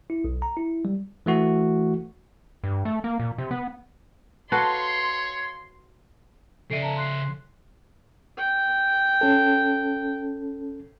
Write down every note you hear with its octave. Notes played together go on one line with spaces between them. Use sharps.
E4
B1
A#5
E4
G3
E3 A3 F#4
G2
A3
A#3
A#2
C3
B3
F#4 A4 B4 C#5 F5 C6
C#3 A4 D5 E5 C7 D7 D#7
A5 A#5
C6 F#6 C7
G5
C#4 A4